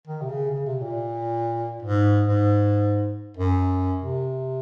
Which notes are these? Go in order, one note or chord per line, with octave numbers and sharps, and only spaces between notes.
D#3
C3
C#3
C#3
C3
A#2
G#2
G#2
F#2
C3